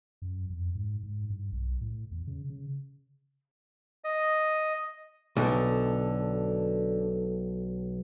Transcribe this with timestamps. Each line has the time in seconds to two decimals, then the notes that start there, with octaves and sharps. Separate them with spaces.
0.22 F#2
0.50 F2
0.75 G#2
1.03 G#2
1.30 G2
1.52 B1
1.81 A2
2.11 E2
2.27 C#3
2.50 C#3
4.04 D#5
5.37 B1 D3